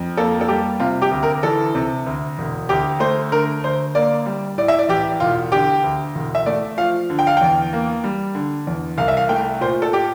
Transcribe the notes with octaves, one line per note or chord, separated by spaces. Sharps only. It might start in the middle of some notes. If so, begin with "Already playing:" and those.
Already playing: F2
A#3 A4
A4
G3 G4
C3 F4
G4
D2
A#4
E3 A4
C3
D2
E1
D2 G4
A3 C5
D3 A#4
D2 C5
A#3 D5
G3
A2 D5
E5
D5
A1 G4
E1 F4
D3 G4
D2
E1
E5
A3 D5
F3 F5
D3
G5
F5
E2 G5
A#3
G3
D3
E2
C2 F5
E5
F5
A3 G5
A#2 C5
A4
G4